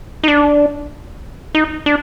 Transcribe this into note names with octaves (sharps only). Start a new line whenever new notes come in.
D#4
D4
D#4
D4